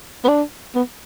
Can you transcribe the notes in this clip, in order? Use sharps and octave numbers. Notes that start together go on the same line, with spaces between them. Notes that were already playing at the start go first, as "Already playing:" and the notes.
B3
D4
B3